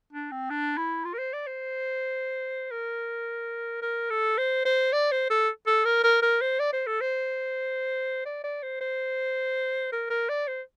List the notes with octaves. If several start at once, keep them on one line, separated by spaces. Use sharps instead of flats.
D4
C4
D4
E4
F4
A#4
C5
D5
C5
A#4
A#4
A4
C5
C5
D5
C5
A4
A4
A#4
A#4
A#4
C5
D5
C5
A4
C5
D5
D5
C5
C5
A#4
A#4
D5
C5